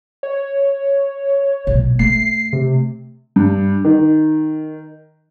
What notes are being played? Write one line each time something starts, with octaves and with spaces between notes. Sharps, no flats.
C#5
B1 A#2
A3 D4 C7
C3
G2
D#3